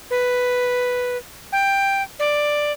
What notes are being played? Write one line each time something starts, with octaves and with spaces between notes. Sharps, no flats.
B4
G5
D5